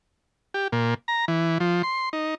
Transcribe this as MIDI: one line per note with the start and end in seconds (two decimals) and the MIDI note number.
0.54 0.68 67
0.72 0.94 46
1.08 1.25 82
1.28 1.58 52
1.60 1.82 53
1.83 2.09 84
2.13 2.35 63